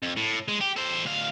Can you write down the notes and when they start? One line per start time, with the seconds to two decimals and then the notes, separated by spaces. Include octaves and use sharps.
0.02 F2
0.16 A2
0.48 G#3
0.61 G4
0.77 A4 C5
1.05 D2 F5